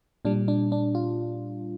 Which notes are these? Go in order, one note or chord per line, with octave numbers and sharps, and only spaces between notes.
A#2 G3 D4
D4
D4
F4